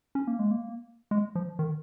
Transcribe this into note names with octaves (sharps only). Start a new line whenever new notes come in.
C#4
A#3
G#3
A#3
G#3
F3
D#3